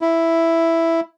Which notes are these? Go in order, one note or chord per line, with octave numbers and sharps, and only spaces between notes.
E4